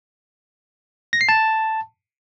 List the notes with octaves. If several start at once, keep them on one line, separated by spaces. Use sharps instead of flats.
A#6
C7
A5